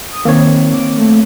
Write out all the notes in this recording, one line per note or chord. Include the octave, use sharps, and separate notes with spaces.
D#6
D#3 A#3 C4 C#5
D6
A3